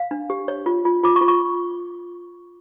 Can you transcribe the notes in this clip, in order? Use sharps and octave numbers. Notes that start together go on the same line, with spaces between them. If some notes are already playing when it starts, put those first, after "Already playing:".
Already playing: F5
D4
G4
C#5
F4
F4
F4 D6
C#6
F4
C#6